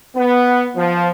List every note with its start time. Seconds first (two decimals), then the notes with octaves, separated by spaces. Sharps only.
0.16 B3
0.76 F3